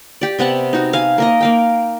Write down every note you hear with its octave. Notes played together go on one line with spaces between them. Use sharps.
G4 D5
C3 B3 F#5 A5
D#4 F#4
F5 G#5
A#3 A#4 D#5
A#3 F5 G5